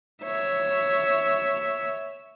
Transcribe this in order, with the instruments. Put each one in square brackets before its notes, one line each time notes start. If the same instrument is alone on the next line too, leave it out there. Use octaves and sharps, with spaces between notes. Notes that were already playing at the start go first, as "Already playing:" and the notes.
[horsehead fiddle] C#5 E5